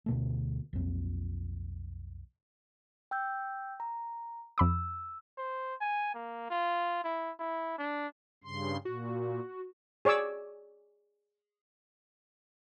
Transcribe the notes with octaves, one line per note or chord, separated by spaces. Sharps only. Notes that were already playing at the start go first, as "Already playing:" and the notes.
D2 B2 A3
B1 F2
G5 E6 G6
A#5
F2 B5 D6 E6
C5
G#5
A#3
F4
E4
E4
D4
G2 C#3 C6
A#2 F#4
G#4 C#5 D5 D6 E6